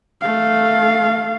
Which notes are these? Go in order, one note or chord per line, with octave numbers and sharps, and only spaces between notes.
A3 F5